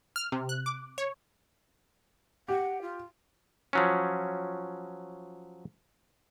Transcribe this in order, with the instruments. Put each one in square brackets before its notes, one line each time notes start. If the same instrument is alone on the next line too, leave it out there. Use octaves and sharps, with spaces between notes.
[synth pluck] F6
C3
F#6
D6
C#5
[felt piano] G4 [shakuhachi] F#5
[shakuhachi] F4
[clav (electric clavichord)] F3 F#3 C#4